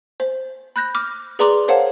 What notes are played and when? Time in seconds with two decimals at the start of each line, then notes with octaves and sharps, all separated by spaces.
0.20 C5
0.76 B5 F#6 G6 A#6
0.95 D6 F6
1.39 G#4 B4 D5 A#5 C6 D6
1.68 A#4 C5 C#5 F5 F#5 A5